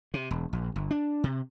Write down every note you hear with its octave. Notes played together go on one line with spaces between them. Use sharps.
C3
E1
A#1
G1
D4
C3